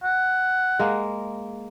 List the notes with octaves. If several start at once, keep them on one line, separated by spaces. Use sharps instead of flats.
F#5
G#3 A#3